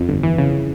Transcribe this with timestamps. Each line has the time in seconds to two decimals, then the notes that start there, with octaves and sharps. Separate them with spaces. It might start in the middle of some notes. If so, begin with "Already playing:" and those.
Already playing: F2
0.09 G1
0.23 E3
0.38 C#3